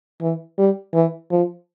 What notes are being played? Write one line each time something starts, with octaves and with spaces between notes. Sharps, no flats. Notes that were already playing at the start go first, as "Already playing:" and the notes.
E3
G3
E3
F3